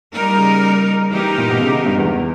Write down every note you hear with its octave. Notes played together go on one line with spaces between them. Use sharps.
G3 A#3 D#4 A#4
C#3
E3 A#3 D#4 G4 A#4
A#2
B2
C#3
B2
G2
E2